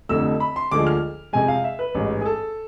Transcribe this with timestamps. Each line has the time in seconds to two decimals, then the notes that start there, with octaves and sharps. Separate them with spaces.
0.09 F1 F2 D3 A3 E6
0.40 B5
0.56 C6
0.71 D2 D3 F3 G#3 D6
0.87 F6
1.33 F2 C3 G#3 G#5
1.48 F5
1.64 E5
1.79 B4
1.95 A1 G#2 G#3
2.21 G#4
2.25 A4